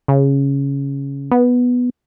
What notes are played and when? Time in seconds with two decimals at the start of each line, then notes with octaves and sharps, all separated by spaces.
0.08 C#3
1.31 B3